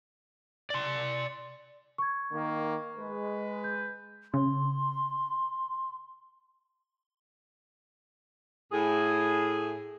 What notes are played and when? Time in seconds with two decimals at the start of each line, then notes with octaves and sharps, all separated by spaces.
0.70 D5 C6
1.98 C#6 G#6
2.31 D#3 A#3
2.97 G#3 B4
3.64 G6
4.34 C#3 C6
8.72 A2 G#4